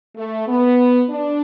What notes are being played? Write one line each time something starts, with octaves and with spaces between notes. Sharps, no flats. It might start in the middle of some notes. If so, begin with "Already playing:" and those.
A3
B3
D4